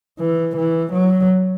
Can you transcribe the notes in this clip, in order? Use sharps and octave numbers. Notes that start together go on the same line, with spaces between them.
E3
E3
F#3